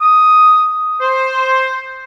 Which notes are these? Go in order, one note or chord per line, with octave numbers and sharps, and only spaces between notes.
D#6
C5